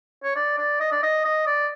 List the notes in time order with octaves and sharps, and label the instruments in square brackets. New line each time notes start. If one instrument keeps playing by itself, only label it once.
[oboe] C#5
D5
D5
D#5
D5
D#5
D#5
D5